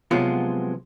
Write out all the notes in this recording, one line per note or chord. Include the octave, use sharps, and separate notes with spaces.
C3 F3 F#3 G#3 B3 F4